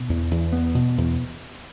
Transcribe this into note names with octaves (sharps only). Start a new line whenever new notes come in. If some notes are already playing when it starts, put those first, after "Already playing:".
Already playing: B2
E2
E2
B3
B2
E2